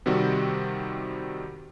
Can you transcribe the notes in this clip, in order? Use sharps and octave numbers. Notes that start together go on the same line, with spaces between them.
C3 D#3 G3 C4 F#4